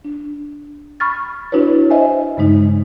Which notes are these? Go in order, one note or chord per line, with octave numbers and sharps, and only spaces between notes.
D4
B5 C#6 F6 A6
D4 E4 F#4 B4 C#5
C5 D#5 E5 G#5
G2 C#3 G#3 D#4